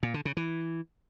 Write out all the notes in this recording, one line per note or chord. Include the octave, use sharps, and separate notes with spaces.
A#2
D3
C#3
E3